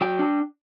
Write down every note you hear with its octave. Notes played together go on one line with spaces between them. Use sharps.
F#3 G5
D4